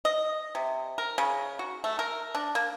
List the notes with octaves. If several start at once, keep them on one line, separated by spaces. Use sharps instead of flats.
D#5
C3
A#4
C#3
F#4
A3
A#4
D4
A#3